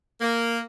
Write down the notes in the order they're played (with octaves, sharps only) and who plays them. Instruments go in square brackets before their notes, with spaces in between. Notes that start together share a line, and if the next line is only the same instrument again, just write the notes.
[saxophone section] A#3